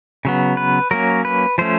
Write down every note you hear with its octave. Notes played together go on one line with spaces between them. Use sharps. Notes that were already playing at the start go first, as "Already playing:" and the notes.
C#3 F#3 B3
B4
F#3 A#3 C#4 A#4
B4
F3 A3 C#4 C5